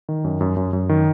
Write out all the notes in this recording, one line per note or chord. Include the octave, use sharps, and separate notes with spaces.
D#3
F#2
F#2
F#2
F#2
D#3